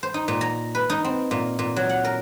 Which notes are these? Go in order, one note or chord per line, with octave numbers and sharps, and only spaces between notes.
C5
D#4
A#2
A#5
B4
D#4
C4
A#2
A#2
F#3
F#5
A#4